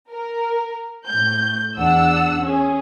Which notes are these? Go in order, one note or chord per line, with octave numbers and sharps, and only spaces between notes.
A#4
A2 G6
E2 D4 F#5 E6
C#4 G#4